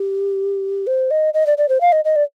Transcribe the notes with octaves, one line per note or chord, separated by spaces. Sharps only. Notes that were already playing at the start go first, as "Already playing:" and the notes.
Already playing: G4
C5
D#5
D#5
D5
D5
C5
F5
D#5
D#5
D5